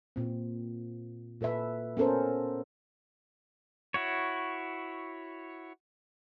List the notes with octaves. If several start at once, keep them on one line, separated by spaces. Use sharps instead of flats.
A#2 C4
A#2 A4 B4 E5
B3 C#4 A4 A#4 C5
E4 F#4 C#5